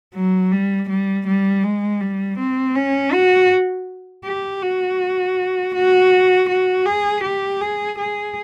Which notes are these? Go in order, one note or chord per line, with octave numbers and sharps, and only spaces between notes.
F#3
G3
G3
G3
G#3
G3
C4
C#4
F#4
G4
F#4
F#4
F#4
G#4
G4
G#4
G#4